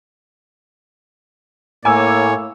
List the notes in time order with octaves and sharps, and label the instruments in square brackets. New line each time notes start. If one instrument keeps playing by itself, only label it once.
[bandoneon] A2 [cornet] A#3 [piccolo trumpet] C#5 [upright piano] G#5 D6 E6